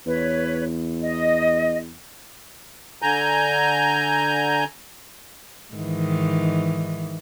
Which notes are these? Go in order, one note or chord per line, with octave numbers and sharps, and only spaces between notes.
E2 B4 C#5
D#5
D3 G#5 A#5 G6
G#2 D#3 E3